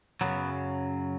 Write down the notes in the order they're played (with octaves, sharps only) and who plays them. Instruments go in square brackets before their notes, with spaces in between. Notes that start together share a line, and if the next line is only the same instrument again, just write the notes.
[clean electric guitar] F#2 C#3 F#3 B3